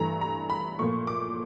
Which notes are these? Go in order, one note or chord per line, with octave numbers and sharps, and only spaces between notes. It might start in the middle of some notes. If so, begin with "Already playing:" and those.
Already playing: G2 E3 A3 A#5
A#5
B5
A#2 F3 A3 C#6
D6